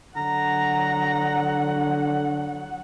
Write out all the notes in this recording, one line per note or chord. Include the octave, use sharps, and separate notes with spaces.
D3 F#3 F#5 A#5